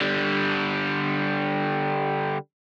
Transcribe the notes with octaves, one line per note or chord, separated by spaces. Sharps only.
D3 G3